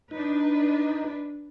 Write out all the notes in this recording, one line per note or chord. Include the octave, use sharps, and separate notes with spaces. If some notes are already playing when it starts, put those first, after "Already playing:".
D4 D#4 B4